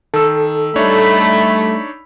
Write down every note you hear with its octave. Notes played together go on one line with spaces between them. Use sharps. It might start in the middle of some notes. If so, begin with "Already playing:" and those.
D#3 A4 E6
G3 A3 D4 D#4 C#5 B5